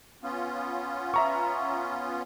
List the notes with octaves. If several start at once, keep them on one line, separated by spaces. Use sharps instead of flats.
B3 C#4 F4
E5 A#5 C#6